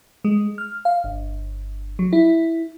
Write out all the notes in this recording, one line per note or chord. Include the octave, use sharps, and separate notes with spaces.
G#3
F6
F5
G1
F#3
E4